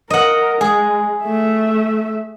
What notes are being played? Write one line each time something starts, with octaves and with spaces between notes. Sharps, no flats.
A#4 D#5 F#5
G#3 G#4
A3 E5